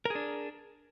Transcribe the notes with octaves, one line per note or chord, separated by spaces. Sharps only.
D4 G#4 A#4